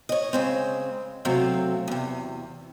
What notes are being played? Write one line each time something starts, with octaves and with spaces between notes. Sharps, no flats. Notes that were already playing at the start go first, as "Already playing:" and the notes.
C#5 D#5
C#3 G#3 C4
C3 F#3 A3 C4 F5
E2 C3